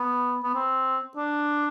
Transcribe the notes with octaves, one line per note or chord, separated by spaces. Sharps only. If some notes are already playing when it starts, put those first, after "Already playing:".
Already playing: B3
B3
C4
D4